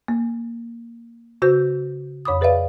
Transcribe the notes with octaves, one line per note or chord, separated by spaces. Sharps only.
A#3
C#3 F#4 C5 G6
F2 C#5 B5 D6 D#6
G#4 B4 D5 E5 F5